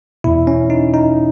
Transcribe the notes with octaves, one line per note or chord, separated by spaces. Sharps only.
E2 B2 E4
C#4
D#4
D#4